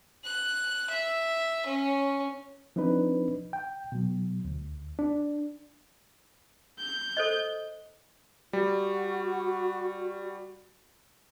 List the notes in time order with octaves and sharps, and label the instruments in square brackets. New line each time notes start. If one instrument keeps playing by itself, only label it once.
[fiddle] F#6
E5
C#4
[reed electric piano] F3 C4 D4 D#4 B4
G5
B2 F#3
D2
D4
[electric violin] G6
[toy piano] A4 C5 D#5
[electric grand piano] G3 [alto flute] F#4